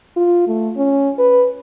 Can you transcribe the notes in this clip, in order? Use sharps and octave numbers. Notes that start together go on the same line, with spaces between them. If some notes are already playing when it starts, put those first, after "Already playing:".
F4
A3
C#4
B4